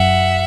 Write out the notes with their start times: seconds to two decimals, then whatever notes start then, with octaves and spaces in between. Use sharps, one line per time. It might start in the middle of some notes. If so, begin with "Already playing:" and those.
Already playing: F#2 E5 F#5